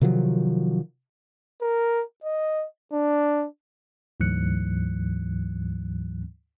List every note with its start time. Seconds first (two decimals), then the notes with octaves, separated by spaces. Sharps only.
0.01 C3 D#3 F3 F#3
1.62 A#4
2.24 D#5
2.93 D4
4.20 D2 G#2 E3 F#3 F#6 C#7